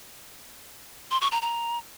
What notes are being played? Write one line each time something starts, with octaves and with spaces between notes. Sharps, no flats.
C6
C#6
A#5
A#5